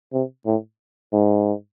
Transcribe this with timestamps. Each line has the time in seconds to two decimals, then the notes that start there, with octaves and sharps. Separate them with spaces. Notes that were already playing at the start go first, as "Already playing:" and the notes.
0.13 C3
0.46 A2
1.13 G#2